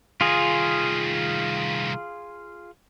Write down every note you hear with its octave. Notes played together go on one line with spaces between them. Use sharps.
C2 D#3 F4 G#4